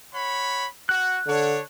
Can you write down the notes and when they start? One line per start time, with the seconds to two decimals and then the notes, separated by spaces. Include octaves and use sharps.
0.13 C#5 F#5 B5
0.89 F#4 F#6
1.27 D3 D4 C#5